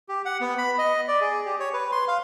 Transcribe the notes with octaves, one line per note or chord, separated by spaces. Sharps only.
G4
F#5
B3
B5
D#5
D5
G#4
G4
C#5
B4
C6
F5